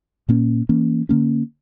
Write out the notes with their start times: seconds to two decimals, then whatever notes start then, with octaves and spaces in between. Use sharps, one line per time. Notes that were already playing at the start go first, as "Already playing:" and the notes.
0.29 A#2 A#3 C#4
0.69 E3 A#3 C#4
1.09 D3 A#3 C#4